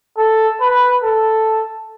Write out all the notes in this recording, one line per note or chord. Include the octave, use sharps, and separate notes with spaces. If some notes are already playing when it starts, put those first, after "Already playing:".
A4
B4
A4